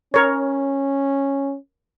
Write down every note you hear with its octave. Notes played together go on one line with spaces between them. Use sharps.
C#4 A#4 C#5